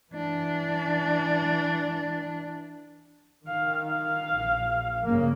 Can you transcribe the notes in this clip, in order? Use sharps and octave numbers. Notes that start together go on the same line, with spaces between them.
E3 D4
D#3 F5
F5
A#1
G2 C#3 A#3